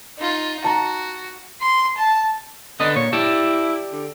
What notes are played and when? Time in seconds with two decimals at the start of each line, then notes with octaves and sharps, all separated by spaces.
0.18 D#4 F4
0.64 F#4 A5 A#5
1.61 C6
1.97 A5
2.80 D3 B3 D4 D#5
2.96 A#2 C#5
3.13 E4 G4 D5 A5
3.92 D3